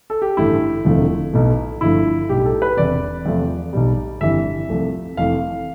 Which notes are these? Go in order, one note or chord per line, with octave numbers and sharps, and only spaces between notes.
A4
G4
A1 G2 D3 A3 E4
E1 D2 C3 F3 A3
B1 B2 A3
G1 G2 F3 A3 E4
B1 A2 G3 G4
A4
B4
E1 E2 C3 D5
E2 C3 F3 A3
B1 B2 G3
G1 F2 E3 G3 E5
C2 C3 F3 A3
F1 F2 E3 A3 F5